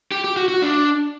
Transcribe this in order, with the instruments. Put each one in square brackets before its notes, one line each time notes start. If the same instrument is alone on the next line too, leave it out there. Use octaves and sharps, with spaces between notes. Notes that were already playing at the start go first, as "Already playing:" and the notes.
[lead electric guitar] G4
G4
F#4
F#4
D4